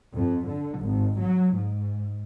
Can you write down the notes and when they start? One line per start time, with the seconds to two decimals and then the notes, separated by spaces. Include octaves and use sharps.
0.16 F2
0.49 D3
0.82 G#1
1.22 F#3
1.56 G#2